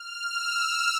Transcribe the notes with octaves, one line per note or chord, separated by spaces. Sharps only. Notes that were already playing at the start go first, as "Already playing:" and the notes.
Already playing: F6
E6